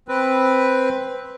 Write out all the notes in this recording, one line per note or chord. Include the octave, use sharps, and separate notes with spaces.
C4 B4